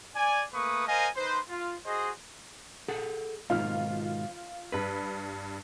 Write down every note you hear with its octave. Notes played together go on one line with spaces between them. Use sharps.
D5 G#5
A3 A#3 B4 C#6 D#6
A#4 C5 D#5 F5 G#5
D#4 B4 C5
F4
F#4 G#4 C5 D#5
G#4 A4 F#5
G#2 B2 D#3 F4 F6
G2 B4 B6